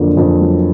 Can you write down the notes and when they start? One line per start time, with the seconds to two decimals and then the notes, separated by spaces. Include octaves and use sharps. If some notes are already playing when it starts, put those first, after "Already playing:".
Already playing: F2 D3 F#3 A#3
0.17 F2
0.41 F#3